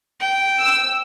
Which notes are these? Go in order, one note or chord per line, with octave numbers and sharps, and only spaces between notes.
G5
E6